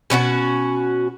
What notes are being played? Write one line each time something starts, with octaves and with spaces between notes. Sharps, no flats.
B2 C#4 E4 F#4